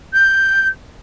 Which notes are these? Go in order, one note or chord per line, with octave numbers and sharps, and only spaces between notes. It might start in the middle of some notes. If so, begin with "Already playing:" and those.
G6